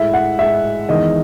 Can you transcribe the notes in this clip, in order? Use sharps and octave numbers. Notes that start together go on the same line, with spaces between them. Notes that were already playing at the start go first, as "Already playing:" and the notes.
Already playing: A2 G#3 E5
F#5
A2 G#3 E5
E2 D#3 G#3 D#5